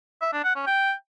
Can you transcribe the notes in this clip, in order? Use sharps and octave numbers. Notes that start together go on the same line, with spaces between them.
E5
D4
F#5
C#4
G5